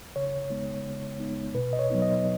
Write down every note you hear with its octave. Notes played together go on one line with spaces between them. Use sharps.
C#3 C#5
G#3 B3 D#4
C#3
G#3 B3 D#4
B2 B4
D#5
C#5
F#3 B3 D#4
D#5